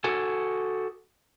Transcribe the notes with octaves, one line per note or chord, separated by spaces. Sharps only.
F#4 A4 G#5